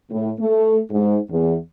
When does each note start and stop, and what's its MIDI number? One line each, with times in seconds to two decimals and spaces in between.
0.11 0.30 45
0.40 0.78 57
0.91 1.17 44
1.30 1.55 40